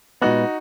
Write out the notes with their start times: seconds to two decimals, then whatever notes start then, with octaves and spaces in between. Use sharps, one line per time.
0.22 A#2 G#3 B3 D#4 F#4